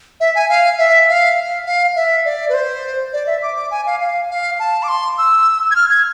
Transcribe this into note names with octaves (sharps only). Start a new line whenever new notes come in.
E5
G#5
F5
E5
F5
F5
E5
D5
B4
C5
D5
E5
D6
D6
G#5
F5
F5
F5
A5
D6
C6
E6
G#6
F6
G#6